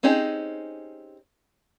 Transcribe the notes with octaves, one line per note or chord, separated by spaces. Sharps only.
C4 C#4 D#4 G4 G#4